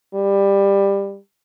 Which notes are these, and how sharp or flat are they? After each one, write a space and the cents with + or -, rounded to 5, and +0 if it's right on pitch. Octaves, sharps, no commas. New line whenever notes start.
G3 +15